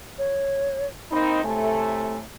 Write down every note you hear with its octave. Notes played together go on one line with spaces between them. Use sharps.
C#5
A#3 C4 D#4 B5
A2 C3 A3 G#5